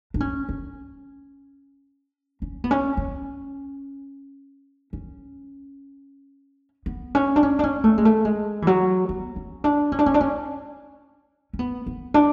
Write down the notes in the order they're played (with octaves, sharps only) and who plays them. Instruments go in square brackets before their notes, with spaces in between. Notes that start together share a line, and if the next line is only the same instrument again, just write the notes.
[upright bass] D4
C#4
C#4
C#4
B3
C#4
C#4
C#4
B3
C#4
D4
C#4
D4
C#4
A3
G#3
A3
G#3
E3
F#3
B3
C#4
D4
C#4
D4
C#4
D4
C#4
C#4
B3
B3
D4